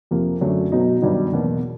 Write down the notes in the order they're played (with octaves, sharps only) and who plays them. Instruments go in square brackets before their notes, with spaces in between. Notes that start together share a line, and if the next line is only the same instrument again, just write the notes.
[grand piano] F2 C3 F3 A#3
F#2 D3 F#3 A3
B2 F#3 B3 D#4
G2 D#3 F#3 B3 D#4
E2 B2 F#3 A#3